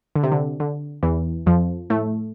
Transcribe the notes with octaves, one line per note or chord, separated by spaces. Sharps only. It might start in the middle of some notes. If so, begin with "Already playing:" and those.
D3
C3
D3
D3
E2 E3
F2 F3
A2 A3